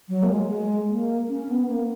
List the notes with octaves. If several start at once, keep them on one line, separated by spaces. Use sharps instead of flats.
F#3
A#3
G#3
G#3
A#3
C#4
B3
A#3